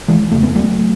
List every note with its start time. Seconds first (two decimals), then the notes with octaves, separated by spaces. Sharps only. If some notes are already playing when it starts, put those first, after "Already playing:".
0.08 E3 G#3
0.32 E2 C#3 A3
0.43 B3
0.55 F#3 A3